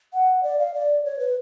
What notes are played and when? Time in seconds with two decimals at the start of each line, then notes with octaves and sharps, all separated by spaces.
0.13 F#5
0.43 D5
0.59 F5
0.74 D5
1.05 C#5
1.19 B4